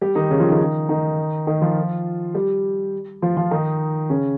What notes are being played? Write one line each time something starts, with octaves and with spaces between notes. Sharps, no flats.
G3 G4
D#3 D#4
C#3 C#4
F3 F4
D#3 D#4
D#3 D#4
D#3 D#4
F3 F4
G3 G4
F3 F4
F3 F4
D#3 D#4
C#3 C#4